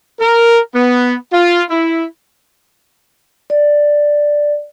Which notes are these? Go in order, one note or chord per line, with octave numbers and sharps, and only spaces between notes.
A#4
B3
F4
E4
D5